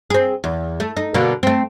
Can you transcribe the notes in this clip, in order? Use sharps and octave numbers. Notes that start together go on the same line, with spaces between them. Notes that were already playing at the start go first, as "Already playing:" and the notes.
C4 G#4
E2
A3
D#4
B2 D3 A#3
A3 C4